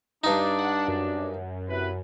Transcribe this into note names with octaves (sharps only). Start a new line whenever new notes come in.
G2 D4 D#4
F#5
F#2
C3 E4 B4